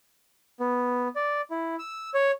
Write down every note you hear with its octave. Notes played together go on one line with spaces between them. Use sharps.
B3
D5
E4
E6
C#5